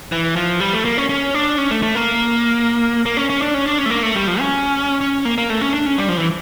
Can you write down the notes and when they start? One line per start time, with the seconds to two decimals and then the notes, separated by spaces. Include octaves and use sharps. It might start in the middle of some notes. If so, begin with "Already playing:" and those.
0.12 E3
0.36 F3
0.60 G3
0.73 A3
0.85 A#3
0.97 C#4
1.09 C#4
1.35 D4
1.58 C#4
1.71 A3
1.83 A3
1.95 A#3
3.06 A#3
3.17 C#4
3.30 C#4
3.42 D4
3.54 C#4
3.66 D4
3.78 C#4
3.86 A3
3.90 A#3
4.03 A3
4.16 G3
4.27 F3
4.39 C#4
5.01 C#4
5.25 A#3
5.38 A#3
5.50 A3
5.61 C#4
5.74 D4
5.86 C#4
5.98 G3
6.09 F3
6.17 E3